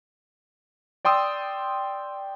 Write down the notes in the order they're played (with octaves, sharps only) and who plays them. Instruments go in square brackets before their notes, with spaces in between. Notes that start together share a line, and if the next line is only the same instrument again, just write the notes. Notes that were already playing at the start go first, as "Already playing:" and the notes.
[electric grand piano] D5 G5 C6 D#6 E6